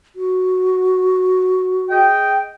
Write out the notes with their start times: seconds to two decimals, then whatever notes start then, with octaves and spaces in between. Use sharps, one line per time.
0.16 F#4
1.89 G#4 D#5 G5